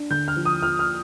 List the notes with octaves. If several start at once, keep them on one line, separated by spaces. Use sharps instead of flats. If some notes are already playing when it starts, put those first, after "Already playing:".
Already playing: D4
D3 G6
F6
F3
D#6
F3 F6
F6